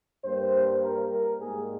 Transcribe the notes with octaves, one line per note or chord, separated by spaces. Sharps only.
G2 G3 A#3 C5
A#4
A#4
G#2 G3 A#3 G#4